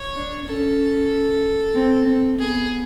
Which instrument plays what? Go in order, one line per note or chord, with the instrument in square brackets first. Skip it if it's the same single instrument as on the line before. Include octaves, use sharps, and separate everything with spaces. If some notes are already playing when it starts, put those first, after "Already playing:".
Already playing: [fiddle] C#5
[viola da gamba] D4
[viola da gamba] C#4 [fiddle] A4
[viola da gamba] C4
C4
[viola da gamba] B3 [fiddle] G#4